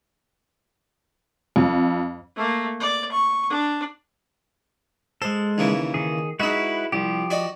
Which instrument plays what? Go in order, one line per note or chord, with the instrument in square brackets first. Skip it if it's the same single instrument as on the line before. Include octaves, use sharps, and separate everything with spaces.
[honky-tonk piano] F2
[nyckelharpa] A3 A#3
D5
C#6
D4
[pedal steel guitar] G#3 A4 [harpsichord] C5
[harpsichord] D#2 C#3 E3
[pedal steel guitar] D#3 G#4
[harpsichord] G#3 D#4 [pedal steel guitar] E4 F#4 B4
[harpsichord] C2 [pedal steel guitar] F3 G4
[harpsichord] F#4 D5 D#5